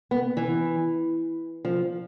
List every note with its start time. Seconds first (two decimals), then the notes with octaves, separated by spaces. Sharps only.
0.11 B3
0.37 E3
1.65 F3